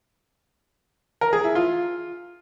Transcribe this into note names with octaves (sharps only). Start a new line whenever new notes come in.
A#4
G#4
E4
F4